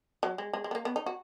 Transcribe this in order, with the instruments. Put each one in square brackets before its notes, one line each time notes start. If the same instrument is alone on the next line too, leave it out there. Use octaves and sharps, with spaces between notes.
[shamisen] F#3
G#3
G#3
G#3
B3
A#3
B3
D#4
F#4